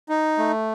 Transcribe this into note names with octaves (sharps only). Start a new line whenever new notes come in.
D#4
A3